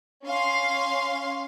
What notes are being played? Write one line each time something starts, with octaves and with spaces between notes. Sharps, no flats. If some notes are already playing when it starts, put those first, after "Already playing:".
C#4 F5 C6